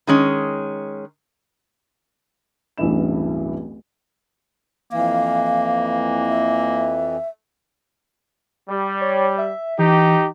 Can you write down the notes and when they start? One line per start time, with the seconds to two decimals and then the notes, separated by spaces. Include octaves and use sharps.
0.07 D#3 G#3 C#4
2.78 D1 A1 G2 E3 E4 E7
4.91 F2 E3 A#3 F5
6.27 E5
8.69 G3
9.01 C#5
9.38 E5
9.79 E3 D#4 G4